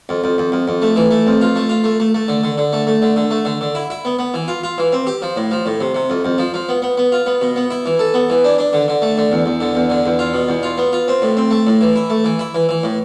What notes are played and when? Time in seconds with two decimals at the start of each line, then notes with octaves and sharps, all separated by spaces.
0.09 F2
0.24 F2
0.38 F2
0.52 F2
0.68 F2
0.82 A3
0.96 E3
1.11 A3
1.27 F2
1.41 F4
1.56 A3
1.69 F4
1.84 A3
2.00 A3
2.14 A3
2.28 D3
2.43 D3
2.58 D3
2.73 A3
2.87 A3
3.02 D3
3.16 D3
3.31 A3
3.45 D3
3.61 D3
3.75 E4
3.90 E4
4.05 B3
4.19 B3
4.34 E3
4.48 F4
4.64 F4
4.78 E3
4.93 C4
5.07 G4
5.22 F3
5.36 A2
5.51 F3
5.66 A2
5.81 C3
5.94 C3
6.10 F2
6.25 F2
6.38 F3
6.54 F3
6.69 B3
6.82 B3
6.97 B3
7.12 F4
7.26 B3
7.41 B2
7.56 B3
7.71 E4
7.86 E3
7.99 A4
8.14 B3
8.30 E3
8.44 D4
8.58 D4
8.73 D3
8.88 D3
9.02 A3
9.18 D3
9.32 E2
9.46 E2
9.61 D3
9.75 E2
9.90 D3
10.06 E2
10.19 F4
10.34 B2
10.49 E2
10.63 F4
10.78 B3
10.93 F4
11.08 C4
11.22 A2
11.37 C4
11.51 A3
11.67 A2
11.81 E3
11.96 E4
12.10 A3
12.25 E3
12.39 E4
12.55 E3
12.69 E3
12.83 A2